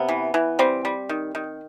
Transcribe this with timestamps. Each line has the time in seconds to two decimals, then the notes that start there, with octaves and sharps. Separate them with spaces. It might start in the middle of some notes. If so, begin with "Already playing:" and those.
Already playing: C3 B3
0.08 E3
0.34 E3
0.59 G3 C4
0.85 G3
1.09 D#3
1.35 D#3